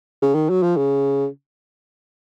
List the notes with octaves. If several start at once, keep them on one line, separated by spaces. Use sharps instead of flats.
C#3
D#3
F#3
F3
C#3